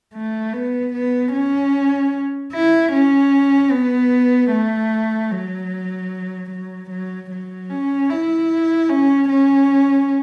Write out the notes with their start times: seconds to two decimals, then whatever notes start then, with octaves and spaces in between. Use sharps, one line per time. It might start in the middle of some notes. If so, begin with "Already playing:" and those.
0.14 A3
0.54 B3
0.94 B3
1.33 C#4
2.53 E4
2.93 C#4
3.72 B3
4.51 A3
5.31 F#3
6.51 F#3
6.91 F#3
7.31 F#3
7.70 C#4
8.10 E4
8.89 C#4
9.29 C#4